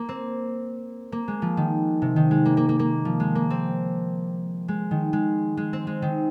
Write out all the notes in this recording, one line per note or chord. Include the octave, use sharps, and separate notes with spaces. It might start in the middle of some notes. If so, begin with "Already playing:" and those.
Already playing: A#3
C4
A#3
G#3
F3
D#3
C3
D#3
G#3
A#3
A#3
A#3
A#3
F3
G#3
A#3
C4
G#3
D#3
G#3
G#3
C4
G#3
D#3